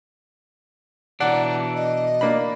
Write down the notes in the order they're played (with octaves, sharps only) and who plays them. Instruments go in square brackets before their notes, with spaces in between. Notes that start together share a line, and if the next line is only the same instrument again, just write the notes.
[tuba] B2 [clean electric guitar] E3 D4 [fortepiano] D5 F#5 [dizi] A#5
[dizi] D#5
[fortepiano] A#3 D4 B5